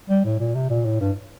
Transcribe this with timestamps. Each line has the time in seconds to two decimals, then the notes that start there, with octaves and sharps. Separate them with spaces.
0.09 G3
0.25 A2
0.40 A#2
0.55 C3
0.70 A#2
0.85 A2
1.01 G2